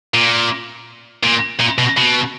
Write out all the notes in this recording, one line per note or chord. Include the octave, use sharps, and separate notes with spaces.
A#2
A#2
A#2
B2
B2